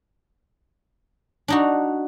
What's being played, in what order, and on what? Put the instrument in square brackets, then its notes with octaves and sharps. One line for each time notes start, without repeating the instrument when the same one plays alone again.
[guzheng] D4 D#4 F#4